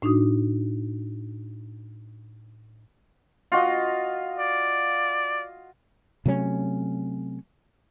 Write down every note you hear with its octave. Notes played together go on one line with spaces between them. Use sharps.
A2 D4 D#4 F#4 D#6
F4 F#4 D#5
D5
C3 F#3 A3 C#4